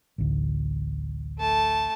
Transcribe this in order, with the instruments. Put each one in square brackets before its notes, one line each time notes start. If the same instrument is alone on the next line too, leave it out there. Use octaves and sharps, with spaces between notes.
[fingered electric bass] A1 D2
[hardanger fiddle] A3 A5